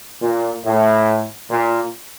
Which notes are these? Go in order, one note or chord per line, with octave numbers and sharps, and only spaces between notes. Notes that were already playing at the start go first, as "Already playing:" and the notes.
A#2
A2
A#2